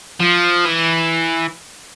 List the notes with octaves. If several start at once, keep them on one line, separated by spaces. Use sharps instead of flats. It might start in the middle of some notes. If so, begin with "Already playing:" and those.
F3
E3